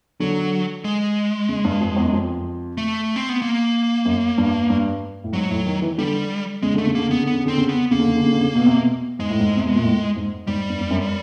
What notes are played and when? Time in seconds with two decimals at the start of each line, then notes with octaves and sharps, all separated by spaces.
0.20 D3 F#3
0.84 G#3
1.49 C#3
1.65 G2
1.81 F2
1.96 E2
2.05 F#2
2.13 F2
2.78 A3
3.16 C4
3.29 B3
3.42 A#3
4.05 F#2
4.38 G2
4.70 G2
5.24 A2
5.33 G#2 F#3
5.50 A2
5.66 D#3
5.82 E3
5.98 D3 G3
6.63 C#3 G#3
6.74 D3 A3
6.86 C#3
6.95 D3 A#3
7.09 C#3 B3
7.22 D3
7.27 B3
7.34 C#3
7.46 D3 C4
7.58 C#3
7.69 B3
7.91 C#3 A#3
7.99 D3
8.08 C#3
8.16 D3
8.25 C#3
8.33 D3
8.41 C#3
8.55 B2
8.66 C3
8.76 B2
9.19 G#2 G#3
9.30 A2
9.40 G#2
9.56 C3
9.65 B2
9.75 A#2
9.83 A2
10.16 G#2
10.47 G#2 G3
10.70 G2
10.80 G2
10.91 F#2